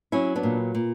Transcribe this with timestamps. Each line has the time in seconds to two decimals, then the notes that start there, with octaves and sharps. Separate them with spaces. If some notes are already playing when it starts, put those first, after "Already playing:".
0.12 F#3 C#4 E4
0.36 B3 D4
0.43 A#2
0.75 A#2